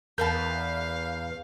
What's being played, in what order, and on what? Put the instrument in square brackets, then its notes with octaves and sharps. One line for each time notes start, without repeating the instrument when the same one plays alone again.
[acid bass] E2 [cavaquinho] A#4 B4 A5 [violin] F5 [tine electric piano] G6